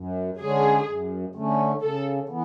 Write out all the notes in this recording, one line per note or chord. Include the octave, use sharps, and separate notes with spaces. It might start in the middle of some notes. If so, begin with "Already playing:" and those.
Already playing: F#2
D3 G#3 C#4 G#4
F#2
D3 A3 C#4
C#3 A4
E3 B3